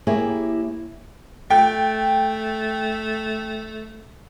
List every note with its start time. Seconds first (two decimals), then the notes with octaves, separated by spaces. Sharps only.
0.07 A#3 E4 G4 G#4 C#5
1.50 A3 G5